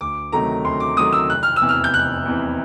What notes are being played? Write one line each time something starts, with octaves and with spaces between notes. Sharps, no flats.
D2 D6
C3 D#3 F#3 A3 A#5
D2 C6
D6
C3 D#3 F#3 A3 D#6
E6
F1 F#6
F6
E6
E2 C3 E3
F6
G6
F1 F#6
E2 C3 E3